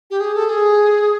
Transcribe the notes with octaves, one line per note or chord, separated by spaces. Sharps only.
G4
G#4
A4
G#4